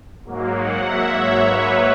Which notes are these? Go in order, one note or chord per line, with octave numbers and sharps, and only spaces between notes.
G#2 F#3 A#3
F#5
E5
C#5
B4